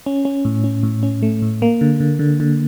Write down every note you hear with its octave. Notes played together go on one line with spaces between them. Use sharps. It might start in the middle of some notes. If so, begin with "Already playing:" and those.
C#4
C#4
A2
C#4
A2
C#4
A3
A2
A#3
D3
D3
D3
D3